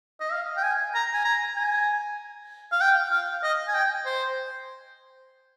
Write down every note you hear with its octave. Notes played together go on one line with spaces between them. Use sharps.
D#5
F5
G5
G#5
A#5
G#5
A#5
G#5
F5
G5
F5
D#5
G#5
G5
C5